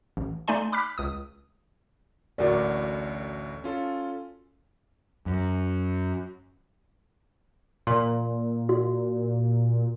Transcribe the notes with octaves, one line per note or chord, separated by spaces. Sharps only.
A1
A3 D#4 D5 G#5 C6
B5 D6 F6 F#6 B6
C#2 D#6
A1 D2 A2 F#4 A#4 D5
C#4 F4 A4
F#2
A#2 C6
F#4